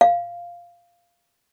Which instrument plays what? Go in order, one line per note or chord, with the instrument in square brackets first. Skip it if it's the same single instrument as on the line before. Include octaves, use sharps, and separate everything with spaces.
[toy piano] F5